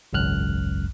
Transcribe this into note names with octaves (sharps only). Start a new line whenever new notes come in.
G#1 C#2 F#2 F6 F#6